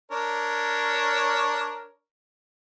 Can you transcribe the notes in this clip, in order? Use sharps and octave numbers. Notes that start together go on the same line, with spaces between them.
D4 A#4 C#5